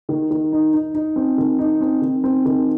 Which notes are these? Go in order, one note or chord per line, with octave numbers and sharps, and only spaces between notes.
D#3
D#3
D#4
D#4
D#4
C4
D#3
D#4
C4
D#3
C4
D#3